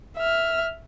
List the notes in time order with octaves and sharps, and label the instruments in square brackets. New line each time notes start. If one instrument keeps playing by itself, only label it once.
[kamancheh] E5 F6